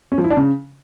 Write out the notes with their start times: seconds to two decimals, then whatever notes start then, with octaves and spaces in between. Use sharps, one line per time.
0.12 C#4
0.18 F3
0.24 E4
0.30 D4
0.37 C#3